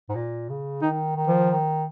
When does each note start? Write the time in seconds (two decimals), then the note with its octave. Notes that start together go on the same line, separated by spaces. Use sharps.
0.09 G#2
0.15 A#2
0.49 C#3
0.82 D#3 D#4
1.16 D#3
1.28 F3
1.50 D#3